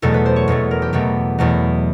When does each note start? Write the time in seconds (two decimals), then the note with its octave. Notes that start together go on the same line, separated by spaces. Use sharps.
0.02 E2 B2 F#3 A3 A4
0.14 B4
0.26 C5
0.36 C#5
0.48 E2 B2 F#3 A3
0.71 A#4
0.82 G4
0.93 E2 B2 F#3 A3 G4
1.39 E2 B2 F#3 A3